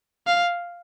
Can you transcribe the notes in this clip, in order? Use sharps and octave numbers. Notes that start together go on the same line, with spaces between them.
F5